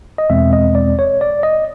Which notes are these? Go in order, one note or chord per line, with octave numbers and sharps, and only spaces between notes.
D#5
E2 B2 G#3 C4 E5
D#5
D5
C#5
D5
D#5